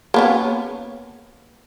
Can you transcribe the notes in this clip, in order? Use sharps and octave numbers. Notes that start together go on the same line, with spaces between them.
A#3 B3 C#4